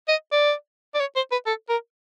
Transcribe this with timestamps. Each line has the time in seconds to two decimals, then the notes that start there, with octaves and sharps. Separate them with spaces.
0.08 D#5
0.32 D5
0.95 D5
1.00 C#5
1.16 C5
1.32 B4
1.46 A4
1.69 A#4